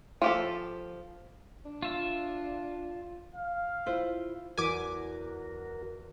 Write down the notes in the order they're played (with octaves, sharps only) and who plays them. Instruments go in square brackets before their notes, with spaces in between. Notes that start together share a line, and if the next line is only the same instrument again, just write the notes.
[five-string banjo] F3 G4 A4
[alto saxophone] D4
[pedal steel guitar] F4 E5
[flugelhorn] F5
[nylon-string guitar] E4 F4 C5
[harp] E2 B6 [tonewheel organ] F#4 A#4 [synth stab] G#5 D6